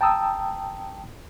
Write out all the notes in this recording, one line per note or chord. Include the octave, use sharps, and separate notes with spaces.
G5 A5 A#5 D#6 E6